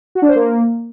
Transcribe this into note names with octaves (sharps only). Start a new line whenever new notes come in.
F#4
D4
C5
A#3